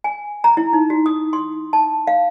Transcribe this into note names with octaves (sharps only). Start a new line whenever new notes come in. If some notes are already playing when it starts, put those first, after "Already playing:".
G#5
A#5
E4
D#4
F#4
D#6
C6
A5
F5